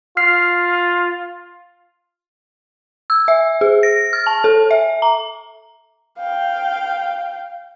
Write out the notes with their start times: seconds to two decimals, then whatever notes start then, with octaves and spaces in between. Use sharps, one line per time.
0.17 F4 F6 C7
3.10 E6
3.28 E5
3.61 G#4
3.83 A#6
4.13 F6
4.27 A5
4.44 A4
4.71 E5
5.02 A#5
6.18 F5 G5